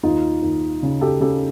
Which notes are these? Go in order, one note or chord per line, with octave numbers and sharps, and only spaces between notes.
D#2 D#4 F4
D#2
C#3
G4 A4
C#3 G4 A4